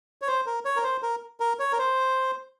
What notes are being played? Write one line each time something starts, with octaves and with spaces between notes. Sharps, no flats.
C#5
C5
A#4
C#5
A#4
C5
A#4
A#4
C#5
A#4
C5